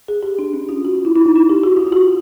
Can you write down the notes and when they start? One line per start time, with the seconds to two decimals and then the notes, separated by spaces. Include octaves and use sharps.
0.08 G#4
0.23 G4
0.39 D4
0.54 C#4
0.69 F4
0.85 F#4
0.95 F4
1.05 E4
1.16 E4
1.26 D#4
1.36 E4
1.49 G4
1.63 F#4
1.77 F4
1.87 F4
1.92 F#4